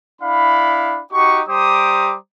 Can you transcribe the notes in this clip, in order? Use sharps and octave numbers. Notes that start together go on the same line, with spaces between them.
D4 E4 F5 B5
D#4 F#4 G4 C#6
G3 G4 C5 A#5 D6 D#6